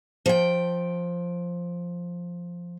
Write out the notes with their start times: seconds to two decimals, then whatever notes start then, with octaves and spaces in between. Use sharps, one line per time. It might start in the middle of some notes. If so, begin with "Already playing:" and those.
0.26 F3 G5